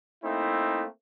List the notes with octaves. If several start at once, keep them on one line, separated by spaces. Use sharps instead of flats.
A3 A#3 C4 D#4 E4